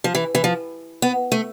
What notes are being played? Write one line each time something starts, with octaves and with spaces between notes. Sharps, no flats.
F3
E3
E3
F3
B3
A3